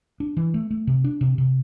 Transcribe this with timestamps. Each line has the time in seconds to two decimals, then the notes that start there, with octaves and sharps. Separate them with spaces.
0.20 D4
0.37 E3
0.54 A3
0.71 A3
0.87 C3
1.04 D4
1.21 C3
1.38 C3